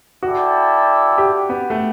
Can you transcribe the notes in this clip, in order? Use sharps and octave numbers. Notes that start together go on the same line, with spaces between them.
E4 F#4 A4 D5 G5
G4
B3
A3